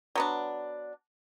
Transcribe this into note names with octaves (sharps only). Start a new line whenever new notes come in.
F#3 B3 D4